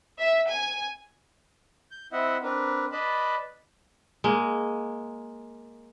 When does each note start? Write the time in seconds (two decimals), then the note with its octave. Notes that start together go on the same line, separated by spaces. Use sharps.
0.19 E5
0.50 G#5
1.91 G6
2.13 C4 E4 D#5 E5 F#5
2.43 C4 D4 A#4 B4
2.92 B4 D5 D#5 A5 B5
4.24 G#3 A#3